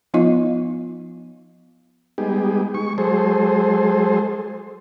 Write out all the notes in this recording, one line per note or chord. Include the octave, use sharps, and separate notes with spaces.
F3 B3 D#4 F4 D#5 F5
G3 G#3 B3 D#4 G4 G#4
G#3 C#6
F#3 G#3 G#4 A4 C5